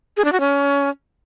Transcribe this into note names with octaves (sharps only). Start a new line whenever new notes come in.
G#4
D4
F#4
C#4